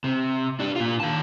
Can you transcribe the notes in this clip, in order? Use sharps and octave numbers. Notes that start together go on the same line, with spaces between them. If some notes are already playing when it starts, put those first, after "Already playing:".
C3
D4 G4
A#2 F4
D#3 A5